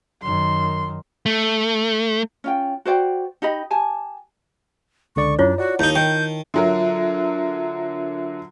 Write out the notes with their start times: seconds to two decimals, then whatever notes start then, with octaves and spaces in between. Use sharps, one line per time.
0.23 F#2 D#3 C6
1.26 A3
2.44 C#4 F4 G5
2.85 F#4 C5 D5 G5
3.42 D#4 G4 D#5 B5
3.70 G4 G#5 A5
5.16 C#2 D3 D5 C#6
5.39 F#2 D4 E4 F4 C#5
5.58 F#4 D5 F#5
5.79 D#2 D#4 E4 A5 G6
5.96 D#3 G5 G6
6.54 D3 F#3 F4 A#4 E5